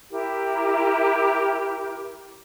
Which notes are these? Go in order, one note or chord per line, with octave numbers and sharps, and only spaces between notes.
E4 G4 A#4